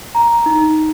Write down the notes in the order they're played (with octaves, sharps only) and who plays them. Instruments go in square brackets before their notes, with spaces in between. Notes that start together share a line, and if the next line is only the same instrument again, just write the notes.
[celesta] A#5
D#4